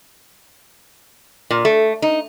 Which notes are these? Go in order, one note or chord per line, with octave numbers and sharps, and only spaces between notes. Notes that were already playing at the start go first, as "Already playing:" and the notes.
A#2
A3
D#4